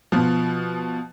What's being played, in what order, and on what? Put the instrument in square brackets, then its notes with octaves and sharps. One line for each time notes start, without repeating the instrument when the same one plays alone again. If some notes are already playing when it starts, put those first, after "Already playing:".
[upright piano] B2 F3